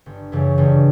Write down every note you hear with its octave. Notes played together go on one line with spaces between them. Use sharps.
G1
F#2 C#3 E3
G1